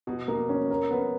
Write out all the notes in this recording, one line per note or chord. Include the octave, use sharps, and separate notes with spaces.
B2
A#3
C#4
A#4
B3